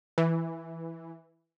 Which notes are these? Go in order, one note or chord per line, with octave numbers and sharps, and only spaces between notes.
E3